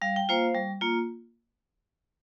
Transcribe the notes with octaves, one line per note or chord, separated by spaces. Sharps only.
G3 F5
G5
A#3 F4 C5 F5
G3
A#3 F4